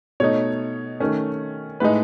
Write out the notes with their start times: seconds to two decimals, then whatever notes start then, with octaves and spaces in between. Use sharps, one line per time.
0.20 B2 A3 D#4 C#5
1.00 D#3 A3 C#4
1.80 A2 G#3 D#4 B4